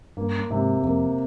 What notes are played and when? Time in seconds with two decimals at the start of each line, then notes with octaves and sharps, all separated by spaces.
0.17 G2 A#3
0.50 G#2 C3
0.84 F2 A#3